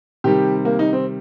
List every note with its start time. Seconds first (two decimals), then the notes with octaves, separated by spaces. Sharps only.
0.24 C3 D#3 G3 G4
0.65 A#3
0.79 D#4
0.93 C4